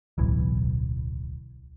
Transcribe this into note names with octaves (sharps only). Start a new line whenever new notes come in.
D1 B1 E3